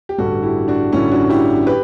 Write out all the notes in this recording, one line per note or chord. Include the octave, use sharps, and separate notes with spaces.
G4
A1 G2 D3 G3 F#4 A4
E4 G4
D4 F#4
A1 G2 D3 G3 C#4 E4
D4 F#4
E4 G4
G4 B4